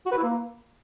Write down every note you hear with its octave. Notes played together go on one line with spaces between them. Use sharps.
F#4
B4
E4
A#3